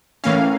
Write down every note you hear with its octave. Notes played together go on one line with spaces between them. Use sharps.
A2 E3 A#3 C#4 F5